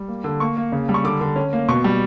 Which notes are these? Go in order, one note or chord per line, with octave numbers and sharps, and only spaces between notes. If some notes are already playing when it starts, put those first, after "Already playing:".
Already playing: G3
A#3
D3
A#3 C#6
A#3
C#3
G3
C#6
D3 D6
D3
C#4
A#3
B2 C#6
G3